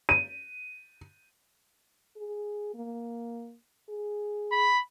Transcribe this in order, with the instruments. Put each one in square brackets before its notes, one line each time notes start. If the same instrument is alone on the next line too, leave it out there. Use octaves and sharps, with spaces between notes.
[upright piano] D#7
[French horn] G#4
A#3
G#4
[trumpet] B5